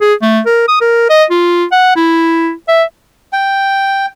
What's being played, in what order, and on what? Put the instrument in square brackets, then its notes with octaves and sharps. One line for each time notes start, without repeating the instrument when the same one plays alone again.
[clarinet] G#4
A3
A#4
D#6
A#4
D#5
F4
F#5
E4
E5
[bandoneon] G5